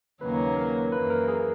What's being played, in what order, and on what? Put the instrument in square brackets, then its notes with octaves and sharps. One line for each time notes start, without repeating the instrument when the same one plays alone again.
[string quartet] D#2 C#3 F#3 A#3 C#4 [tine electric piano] B4
[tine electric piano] A#4
[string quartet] F#2 E3 A#3 [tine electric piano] B4
[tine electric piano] A#4
G#4